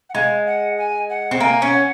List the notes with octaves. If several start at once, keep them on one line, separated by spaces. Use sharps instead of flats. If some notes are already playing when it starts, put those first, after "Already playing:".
F#5
G#3 F5
F#5
G#5
F#5
C4
A#3 G#5
C#4
F#5